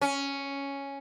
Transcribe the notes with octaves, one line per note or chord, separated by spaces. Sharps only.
C#4